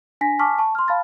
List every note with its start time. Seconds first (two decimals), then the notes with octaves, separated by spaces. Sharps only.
0.21 D4 G#5 A#6 B6
0.39 G#5 A5 C#6 D6 F6 B6
0.59 A5 C#6
0.75 C6 F6
0.88 F5 A5 B5 F6 A6